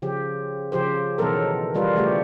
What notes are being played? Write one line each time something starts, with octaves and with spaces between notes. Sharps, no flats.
C#3 F3 G4
C#3 F3 G4 C5
B2 D#3 E3 F#3 A4 A#4
E3 G3 F4 A#4 B4
C#3 F3 G3 A3 F#4 G4